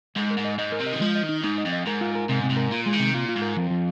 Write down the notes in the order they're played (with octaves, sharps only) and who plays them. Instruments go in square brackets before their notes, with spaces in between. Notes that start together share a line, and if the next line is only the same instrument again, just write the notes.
[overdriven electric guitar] G#2 [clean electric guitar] G#3
[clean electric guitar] A#4
[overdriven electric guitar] G#2
[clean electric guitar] D#5
[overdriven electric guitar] G#2 [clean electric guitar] D#5
[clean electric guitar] A#4
[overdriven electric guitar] C3
[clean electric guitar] D#5
[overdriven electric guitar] D#3
[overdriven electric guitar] F3 [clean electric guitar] G#3
[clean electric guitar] D#5
[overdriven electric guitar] D#3
[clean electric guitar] D#4
[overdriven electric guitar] G#2 [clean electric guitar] D#4
[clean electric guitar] D#5
[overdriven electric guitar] F2
[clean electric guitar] D#5
[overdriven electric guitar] G#2 [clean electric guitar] A#4
[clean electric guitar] F4
A#4
[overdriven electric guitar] G#2 [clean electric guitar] C3
[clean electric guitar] C3
[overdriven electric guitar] G#2
[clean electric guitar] A#4
[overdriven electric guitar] A#2 [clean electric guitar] F4
[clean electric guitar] G#3
[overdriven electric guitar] D#3
[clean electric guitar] C3
[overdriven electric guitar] A#2 [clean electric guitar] F4
[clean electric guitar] F4
[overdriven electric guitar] G#2
[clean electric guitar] A#4
[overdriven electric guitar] F2 [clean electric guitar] F3
[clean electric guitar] F3